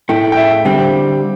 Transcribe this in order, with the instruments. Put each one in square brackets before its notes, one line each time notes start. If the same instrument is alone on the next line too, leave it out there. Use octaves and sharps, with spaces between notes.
[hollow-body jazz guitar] A2 A3 E4 [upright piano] G5
[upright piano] G5
E5
[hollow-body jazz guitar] D3 G3 C4 [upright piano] G5